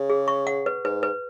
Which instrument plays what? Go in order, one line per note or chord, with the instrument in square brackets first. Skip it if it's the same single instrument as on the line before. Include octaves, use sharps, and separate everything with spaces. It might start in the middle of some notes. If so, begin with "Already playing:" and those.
Already playing: [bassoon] C#3
[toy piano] G#4
C#6
F#5
B4
[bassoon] G#2 [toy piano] B4
[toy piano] B4